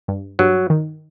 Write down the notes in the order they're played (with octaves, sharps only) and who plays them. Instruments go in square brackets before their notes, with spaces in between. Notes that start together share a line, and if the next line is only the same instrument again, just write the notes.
[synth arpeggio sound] G2
[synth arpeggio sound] G2 [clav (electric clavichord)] F#3
[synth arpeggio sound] D#3